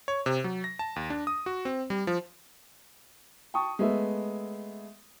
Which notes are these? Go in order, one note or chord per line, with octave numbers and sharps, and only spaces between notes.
C#5
C3
F#3
A#6
A5
D#2
D4
D#6
F#4
C4
G3
F3
G5 A5 C#6 D#6
G#3 A3 B3 E5